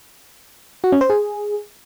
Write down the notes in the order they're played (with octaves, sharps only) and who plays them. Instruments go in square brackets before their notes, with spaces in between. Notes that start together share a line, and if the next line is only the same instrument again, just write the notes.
[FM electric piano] F#4
C#4
C5
G#4